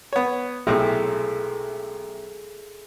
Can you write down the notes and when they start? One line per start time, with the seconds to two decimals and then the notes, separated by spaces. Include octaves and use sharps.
0.13 B3 C#5
0.67 B1 A2 C3 G#4 A4 E5